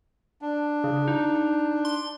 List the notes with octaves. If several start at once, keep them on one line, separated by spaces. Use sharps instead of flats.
D4
C#3
D#4
C6